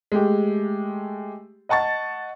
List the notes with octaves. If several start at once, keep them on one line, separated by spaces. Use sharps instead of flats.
G#3 A3 G4
D#5 F#5 A5 C#6 A6